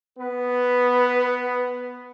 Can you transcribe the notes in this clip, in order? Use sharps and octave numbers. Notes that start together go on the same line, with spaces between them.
B3 B4